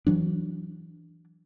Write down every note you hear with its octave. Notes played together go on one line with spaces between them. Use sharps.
E3 F#3 D4